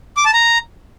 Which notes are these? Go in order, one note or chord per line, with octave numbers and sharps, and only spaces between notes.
D6
A5
A#5